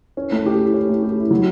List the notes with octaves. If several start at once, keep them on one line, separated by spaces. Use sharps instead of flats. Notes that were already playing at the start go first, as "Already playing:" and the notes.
C#4
A3
G4
E4
C#4
A3
G4
E4
F#3